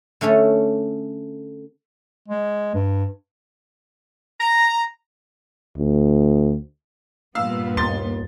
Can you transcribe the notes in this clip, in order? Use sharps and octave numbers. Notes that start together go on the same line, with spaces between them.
D3 A3 C#4 A4
G#3
G2
A#5
D2
G2 A#2 B3 F5 E6
D#2 C6 A6